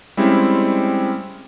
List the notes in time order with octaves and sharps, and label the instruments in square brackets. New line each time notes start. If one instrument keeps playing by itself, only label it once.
[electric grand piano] G3 G#3 C4 C#4 E4